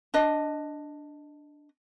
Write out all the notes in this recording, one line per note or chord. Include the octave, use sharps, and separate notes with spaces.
D4 D#5